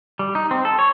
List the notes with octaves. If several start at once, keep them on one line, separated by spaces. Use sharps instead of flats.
G3
D#4
C4
A4
C#5